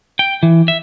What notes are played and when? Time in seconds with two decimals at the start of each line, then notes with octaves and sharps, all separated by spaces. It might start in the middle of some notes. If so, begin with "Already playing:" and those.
0.19 G5
0.43 E3
0.68 E5